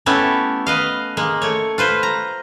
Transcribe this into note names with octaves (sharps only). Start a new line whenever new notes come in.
A3 B3 C#4 E4 G4 A4
B4 D#5 F5
G#3 A#3
A3 C#5
F4 B4 C5
A#5